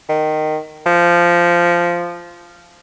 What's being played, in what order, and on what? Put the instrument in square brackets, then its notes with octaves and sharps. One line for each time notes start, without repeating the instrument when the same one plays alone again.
[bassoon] D#3
F3